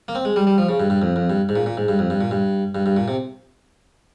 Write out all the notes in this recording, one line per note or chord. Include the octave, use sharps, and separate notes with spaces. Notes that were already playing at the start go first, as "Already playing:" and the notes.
A#3
C4
G#3
G3
G3
F3
C#3
G2
G2
F2
F2
G2
G#2
A#2
A#2
G#2
G2
F2
G2
A#2
G2
G2
G2
A#2
C3